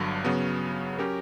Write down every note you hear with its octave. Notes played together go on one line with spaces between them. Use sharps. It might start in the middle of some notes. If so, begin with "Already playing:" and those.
Already playing: G1 G2 D3 F#3
C#3 F#3 B3
F#3 C#4 G4 A#4